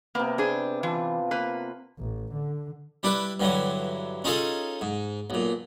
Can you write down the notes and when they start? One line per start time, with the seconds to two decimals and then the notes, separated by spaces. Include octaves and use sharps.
0.15 C3 A#3 B3
0.38 D4 G#4 C5
0.83 E3 F4 A5
1.31 A#3 B4
1.99 A1
2.33 D3
3.03 G3 D4 E4 B4
3.40 G2 D3 E3 F#3
4.24 C#4 D#4 F4 G#4 A4 D#5
4.81 G#2
5.30 B1 A#2